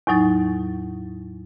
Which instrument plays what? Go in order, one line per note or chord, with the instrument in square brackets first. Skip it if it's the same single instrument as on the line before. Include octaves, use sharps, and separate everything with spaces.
[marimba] E2 A2 F#3 D#4 A6